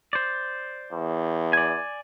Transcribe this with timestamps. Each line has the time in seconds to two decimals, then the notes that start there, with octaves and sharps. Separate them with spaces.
0.13 C5 D5
0.92 E2
1.53 D5 G#5